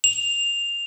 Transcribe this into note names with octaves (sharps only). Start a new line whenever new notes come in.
F7